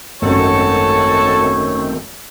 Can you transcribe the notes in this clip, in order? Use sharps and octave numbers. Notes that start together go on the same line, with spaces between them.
G#1 F#2 D#3 A3 C4 F#4 A4 C#5